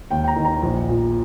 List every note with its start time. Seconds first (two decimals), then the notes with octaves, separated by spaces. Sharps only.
0.11 D#2 G5
0.24 G5
0.28 A#5
0.36 D#3
0.45 A#5
0.63 A#1
0.88 A#2 F3